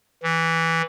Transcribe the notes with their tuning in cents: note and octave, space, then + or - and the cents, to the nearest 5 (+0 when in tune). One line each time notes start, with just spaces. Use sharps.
E3 -5